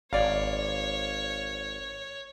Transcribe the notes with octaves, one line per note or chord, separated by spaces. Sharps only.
G#1 C#5 D5 F5